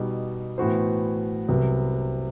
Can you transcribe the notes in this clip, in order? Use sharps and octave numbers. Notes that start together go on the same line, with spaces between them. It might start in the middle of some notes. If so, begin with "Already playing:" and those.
Already playing: B2 G3 D#4 G4
A2 E3 B3 F#4 C5
C2 C3 F#3 B3